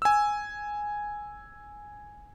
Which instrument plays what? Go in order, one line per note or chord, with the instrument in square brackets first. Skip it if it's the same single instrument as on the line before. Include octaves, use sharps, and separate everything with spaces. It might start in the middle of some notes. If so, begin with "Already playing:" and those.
[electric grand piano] G#5 E6